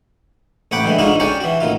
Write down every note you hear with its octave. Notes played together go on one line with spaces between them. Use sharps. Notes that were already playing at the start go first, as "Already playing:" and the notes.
A1 C#5 F#5 G5 B5 D6
D3 E3 G#3
G#2 D3 D4 D#4 F4 F#4
C#4 F#4 C#5 D5 G5
E3 F#4
A1 D#3 F4